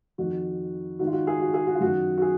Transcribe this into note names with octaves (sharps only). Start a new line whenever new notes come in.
F2 D#3 F#4
G#2 D#3 F#4
F4
F#4
G#4
F#4
G#4
F#4
F4
F#2 D#3 F#4
F#4
G#4